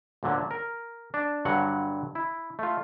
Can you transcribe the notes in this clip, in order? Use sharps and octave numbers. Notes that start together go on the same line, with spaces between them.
D2 A#2 D3 F#3
A#4
D4
G2 D3 F#3 F#5
E4
A3 F4